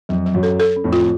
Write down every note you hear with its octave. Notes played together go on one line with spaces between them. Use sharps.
F2 F#3
F#3
F#2
A4
A4
C#4
F2 A2
F4